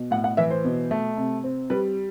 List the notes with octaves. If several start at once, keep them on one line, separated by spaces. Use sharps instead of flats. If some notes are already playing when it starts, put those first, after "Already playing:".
Already playing: B2
A2 F#5
F#5
E3 E5
C5
B2
A3
C3
C4
G3 B4